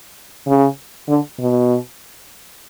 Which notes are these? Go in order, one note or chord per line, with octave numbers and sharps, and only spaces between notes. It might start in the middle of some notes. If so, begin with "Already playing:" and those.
C#3
D3
B2